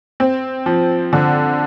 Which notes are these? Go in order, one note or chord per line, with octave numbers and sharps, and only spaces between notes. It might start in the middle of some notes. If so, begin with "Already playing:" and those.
C4
F3
D3